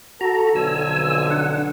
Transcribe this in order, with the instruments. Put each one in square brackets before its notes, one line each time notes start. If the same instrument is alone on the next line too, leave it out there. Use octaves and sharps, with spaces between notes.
[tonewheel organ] F#4 A#5 [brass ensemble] A4
[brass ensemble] B1 F2 D3 [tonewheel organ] G#5 E6
[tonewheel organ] D4 F#5